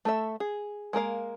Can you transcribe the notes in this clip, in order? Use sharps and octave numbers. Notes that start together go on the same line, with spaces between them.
A3 A4 E5
G#4
G#3 A#3 A#4 F5